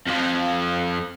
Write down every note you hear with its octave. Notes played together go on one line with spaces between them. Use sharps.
F2 F3